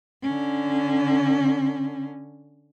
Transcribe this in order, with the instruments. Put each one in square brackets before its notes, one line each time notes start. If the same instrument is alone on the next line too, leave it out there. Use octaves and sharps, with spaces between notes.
[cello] D3 C#4